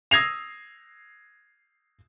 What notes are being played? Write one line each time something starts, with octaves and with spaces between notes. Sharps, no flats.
D#6 E6 G#6 A#6 C7 F7